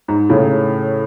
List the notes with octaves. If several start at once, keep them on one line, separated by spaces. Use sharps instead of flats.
G#2
A2 C#3